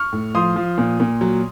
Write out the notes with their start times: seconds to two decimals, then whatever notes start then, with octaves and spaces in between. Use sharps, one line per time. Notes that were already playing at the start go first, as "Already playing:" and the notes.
Already playing: C#6 F6
0.13 A2
0.34 F3 C6 D#6
0.56 F3
0.78 A#2
1.00 A#2
1.21 F#3